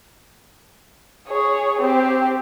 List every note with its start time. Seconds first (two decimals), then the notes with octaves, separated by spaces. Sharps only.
1.28 G#4 C#5
1.81 C4 G4